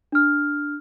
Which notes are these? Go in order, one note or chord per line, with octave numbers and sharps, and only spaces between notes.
D4 F6